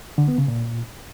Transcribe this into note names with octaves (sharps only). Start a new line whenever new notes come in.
D3
B3
C#3
A#2